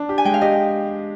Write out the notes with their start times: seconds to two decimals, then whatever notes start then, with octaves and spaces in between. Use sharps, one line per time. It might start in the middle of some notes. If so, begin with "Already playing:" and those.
Already playing: D4
0.09 G4
0.18 G#5
0.25 G#3 G5
0.34 F5
0.41 G4 D#5